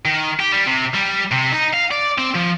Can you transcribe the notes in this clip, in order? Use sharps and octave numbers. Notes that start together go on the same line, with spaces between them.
D#3
G4
G3
C3
G3
C3
D#4
F5
D5
C4
F3